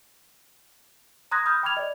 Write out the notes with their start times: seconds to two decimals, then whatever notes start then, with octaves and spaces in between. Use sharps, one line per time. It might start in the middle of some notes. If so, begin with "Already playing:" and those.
1.31 A#5 C6 D#6 F#6 G#6 A#6
1.45 B5 D#6 F6 G6
1.63 G5 B5 D6 F6 G#6 F7
1.77 D5 D#5